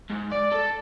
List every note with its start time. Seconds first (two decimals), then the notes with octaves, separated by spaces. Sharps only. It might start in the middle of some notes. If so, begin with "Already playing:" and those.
0.10 G#2
0.32 D5
0.52 A4